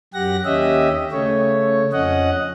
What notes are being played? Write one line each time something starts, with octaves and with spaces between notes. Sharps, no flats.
F#2 G4 F#5 A#6
D#2 C#4 G4 D#5 E5
C#3 A3 C#5
F2 C#4 D#5 F#5